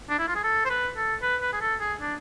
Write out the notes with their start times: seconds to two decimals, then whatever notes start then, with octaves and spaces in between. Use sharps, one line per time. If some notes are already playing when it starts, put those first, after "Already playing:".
0.10 D4
0.19 E4
0.28 F4
0.35 G#4
0.44 A4
0.65 C5
0.70 B4
0.97 A4
1.22 B4
1.42 B4
1.53 G#4
1.61 A4
1.80 G#4
2.01 D4